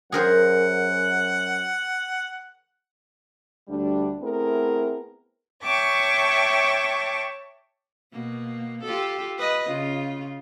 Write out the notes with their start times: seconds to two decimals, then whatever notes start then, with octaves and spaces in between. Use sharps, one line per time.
0.12 F#2 G#4 A#4 C5 F#5
3.68 D2 G3 D4
4.20 A3 B3 C4 E4 G#4 A#4
5.62 C#5 E5 G5 A5 C#6 D6
8.12 B2 A#3
8.83 F4 G4 A4
9.38 B4 D#5
9.68 C#3 F4